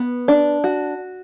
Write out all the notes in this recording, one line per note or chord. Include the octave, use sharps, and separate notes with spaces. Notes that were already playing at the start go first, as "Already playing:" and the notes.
Already playing: B3
D4
F#4